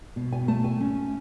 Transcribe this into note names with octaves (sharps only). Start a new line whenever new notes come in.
B2
G#5
A3 A5
G#5
C#4